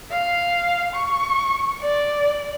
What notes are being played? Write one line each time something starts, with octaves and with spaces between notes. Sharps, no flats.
F5
C#6
D5